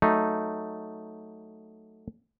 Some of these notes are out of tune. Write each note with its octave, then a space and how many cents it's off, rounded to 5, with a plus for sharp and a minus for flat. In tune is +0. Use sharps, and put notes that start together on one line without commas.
F#3 +0 A3 +0 D#4 +0